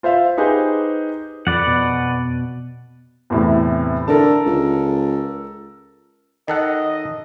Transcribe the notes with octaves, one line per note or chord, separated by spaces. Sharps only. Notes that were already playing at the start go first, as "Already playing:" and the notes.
F4 C5 E5 F5
D#4 G4 G#4 B4 C5
F2 B4 D5 F#5
B2
E2 A2 C3
D3 A4 A#4 A5
C#2
D#3 A4 D#5 F#5